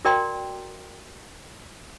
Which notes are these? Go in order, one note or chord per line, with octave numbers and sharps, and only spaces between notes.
F#4 A#4 D5 G5 A#5 C6